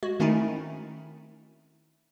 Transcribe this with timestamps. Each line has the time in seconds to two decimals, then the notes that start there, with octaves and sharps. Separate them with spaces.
0.03 G#3 F#4
0.20 D#3 A3 C4 C#4 D#4 E4